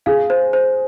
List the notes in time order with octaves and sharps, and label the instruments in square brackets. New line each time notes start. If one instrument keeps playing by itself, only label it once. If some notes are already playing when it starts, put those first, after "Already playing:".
[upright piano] G#4 [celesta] F5
[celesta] C5
C5